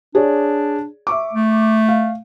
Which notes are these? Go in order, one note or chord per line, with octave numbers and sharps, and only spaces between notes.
D4 G#4 C#5 D5
E5 C#6 D6
A3
F5